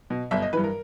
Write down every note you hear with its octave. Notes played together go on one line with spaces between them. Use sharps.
B2
G1 E5
D#5
G2 E3 B4
A#4